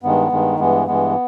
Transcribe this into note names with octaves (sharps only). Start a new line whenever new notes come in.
G2 D#3 G#3 B3
G2 D#3 G#3
G2 E3 G#3 B3
G2 E3 G#3 B3